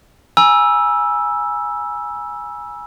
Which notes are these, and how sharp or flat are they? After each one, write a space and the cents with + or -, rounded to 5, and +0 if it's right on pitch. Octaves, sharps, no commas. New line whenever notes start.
G#5 +0 B5 -45 E6 +0